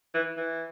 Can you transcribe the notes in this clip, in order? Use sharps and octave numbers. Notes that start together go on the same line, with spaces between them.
E3
E3